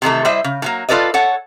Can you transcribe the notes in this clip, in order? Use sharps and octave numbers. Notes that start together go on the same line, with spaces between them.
C3 D#3 E3 A3
G3 E4 C5 D#5 E5
C#3
A2 F#3 A#3
F4 A4 B4 D5 D#5
A4 C#5 F#5